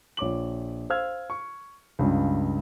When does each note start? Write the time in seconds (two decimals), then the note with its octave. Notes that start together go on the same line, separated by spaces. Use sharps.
0.17 A#1 C#5 D6 F#7
0.90 C5 F5 E6 F6 G#6
1.30 C#6
1.99 C#2 G2 C#3